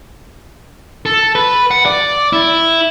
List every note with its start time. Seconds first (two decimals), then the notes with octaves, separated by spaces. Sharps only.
1.06 A4
1.35 B4
1.71 F#5
1.86 D5
2.33 E4